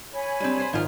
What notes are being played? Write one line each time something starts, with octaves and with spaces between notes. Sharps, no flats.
C#5 G#5 B5
G3 G#3 C4 D4
B4 C5
G#1 D#3 F3 F4 D#5